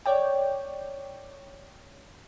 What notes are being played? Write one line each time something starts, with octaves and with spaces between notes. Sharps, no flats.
C#5 D5 G5